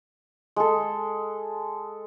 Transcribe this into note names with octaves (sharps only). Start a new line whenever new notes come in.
G#3 A4